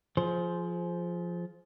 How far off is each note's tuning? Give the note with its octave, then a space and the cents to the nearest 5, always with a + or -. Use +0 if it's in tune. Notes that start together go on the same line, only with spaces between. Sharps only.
F3 +0 G#4 +30 C5 +0